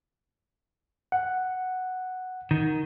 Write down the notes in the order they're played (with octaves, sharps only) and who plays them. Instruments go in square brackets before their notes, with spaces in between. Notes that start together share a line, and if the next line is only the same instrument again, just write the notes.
[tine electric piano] F#5
[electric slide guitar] D#3